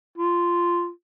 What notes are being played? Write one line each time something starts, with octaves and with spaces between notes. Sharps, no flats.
F4